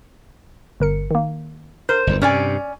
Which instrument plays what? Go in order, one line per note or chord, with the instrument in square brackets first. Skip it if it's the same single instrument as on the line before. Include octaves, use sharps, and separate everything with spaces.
[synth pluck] G1 A#4 C#7
D#3 A#3
[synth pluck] A#4 [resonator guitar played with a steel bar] C5
[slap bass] G1 E2
[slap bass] G2 C3 [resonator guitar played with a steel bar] C#4 D5 G#5